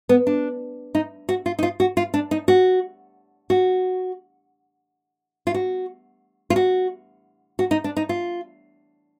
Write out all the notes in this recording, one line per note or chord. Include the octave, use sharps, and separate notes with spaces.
B3
D4
D#4
F#4
F4
D#4
F4
F#4
F4
D4
D#4
F#4
F#4
F4
F#4
F4
F#4
F#4
D#4
D4
D#4
F4